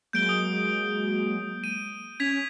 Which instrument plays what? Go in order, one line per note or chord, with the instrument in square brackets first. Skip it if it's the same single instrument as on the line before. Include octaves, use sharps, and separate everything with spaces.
[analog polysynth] F#3 G#3 A#3 [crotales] G6 D7 G7
[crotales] D#6
D#7
[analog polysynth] C#4 [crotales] G#6 B6 F7